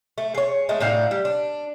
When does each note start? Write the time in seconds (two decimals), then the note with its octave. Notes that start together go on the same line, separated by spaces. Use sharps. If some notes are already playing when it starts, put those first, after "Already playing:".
0.18 A3
0.35 G#4 C#5
0.69 G#3 A3
0.80 A2 D4 D#4 F5
1.11 G3
1.25 D4